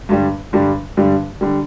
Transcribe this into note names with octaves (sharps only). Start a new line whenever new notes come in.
G2 D3 G3
G2 D3 G3
G2 D3 G3
D3 G3